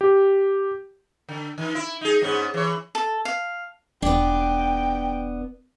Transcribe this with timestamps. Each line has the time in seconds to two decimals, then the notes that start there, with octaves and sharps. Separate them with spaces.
0.01 G4
1.29 D3
1.58 D#3
1.75 E4
2.01 D#4 G#4
2.22 G#2 B3 C#4
2.54 E3 C#5
2.95 A4
3.25 F5
4.02 E1 B3 D4 G5